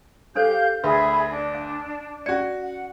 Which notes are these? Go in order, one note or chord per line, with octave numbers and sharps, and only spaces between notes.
D4 G4 A4 C5 F5 G6
D2 G#4 B4 E5 B5
D4
F5
C#4 F#4 D5 C#7
F#5